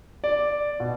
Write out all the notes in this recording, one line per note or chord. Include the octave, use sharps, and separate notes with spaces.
D5
B2